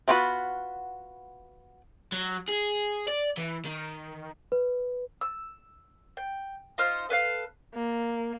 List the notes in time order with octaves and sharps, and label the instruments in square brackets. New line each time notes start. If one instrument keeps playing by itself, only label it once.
[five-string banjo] B3 F4 F#4 A#4 B4
[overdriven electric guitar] F#3
G#4
D5
E3
D#3
[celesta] B4
[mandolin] E6
G5
D#4 F4 C5 F6
A4 B4 C#5 F5
[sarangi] A#3